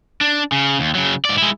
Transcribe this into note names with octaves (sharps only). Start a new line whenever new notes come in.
D4
C#3
D#2
C#3 F#3
G#2 D5
G#3 E4